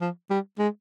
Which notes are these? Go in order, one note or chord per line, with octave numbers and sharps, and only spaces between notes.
F3
G3
G#3